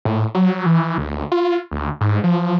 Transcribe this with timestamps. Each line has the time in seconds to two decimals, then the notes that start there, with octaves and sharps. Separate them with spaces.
0.05 A2
0.35 F#3
0.66 E3
0.98 D2
1.32 F4
1.71 D2
2.01 G#2
2.24 F3